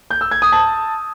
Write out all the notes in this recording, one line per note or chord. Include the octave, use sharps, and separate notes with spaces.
G6
E6
G#6
D#6
A5